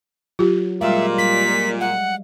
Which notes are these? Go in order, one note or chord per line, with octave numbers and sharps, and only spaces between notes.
F#3 F4 G4
A#2 G3 G#3 E5 F5
G3 B6
F#5